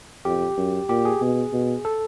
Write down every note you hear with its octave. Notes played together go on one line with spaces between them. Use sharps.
F2 G4
F#2
A#2 G4
G#4
B2
B2
A4